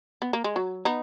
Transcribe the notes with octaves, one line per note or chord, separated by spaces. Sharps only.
B3
A#3
G#3
F#3
B3 D#4